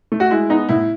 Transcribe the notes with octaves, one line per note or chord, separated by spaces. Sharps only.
A3
F#4
G#3 E4
B3 D#4
A2 E4